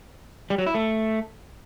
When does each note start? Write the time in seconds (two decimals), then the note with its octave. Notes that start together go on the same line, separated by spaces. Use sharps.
0.50 G3
0.58 F#3
0.66 E4
0.74 A3